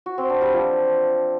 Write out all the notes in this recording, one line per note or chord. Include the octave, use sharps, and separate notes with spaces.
F#4
C4
D4
G3
F3